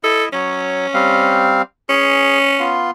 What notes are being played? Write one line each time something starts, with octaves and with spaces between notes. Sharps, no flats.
E4 A4 D#5 E5
F#3 C#4 C#5
G3 C4 F5
C#4 G#4
B3 F4 C6